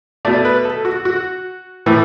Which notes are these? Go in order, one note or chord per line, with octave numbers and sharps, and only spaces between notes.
B2 A3 D5
B4
A4
F#4
F#4
A2 E3 A3